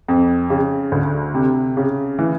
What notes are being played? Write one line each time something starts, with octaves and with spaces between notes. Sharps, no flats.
F2
C#3
D2
C3
C#3
E3